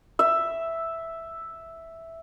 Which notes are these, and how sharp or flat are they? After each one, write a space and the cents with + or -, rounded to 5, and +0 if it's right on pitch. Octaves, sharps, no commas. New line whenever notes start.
E5 +0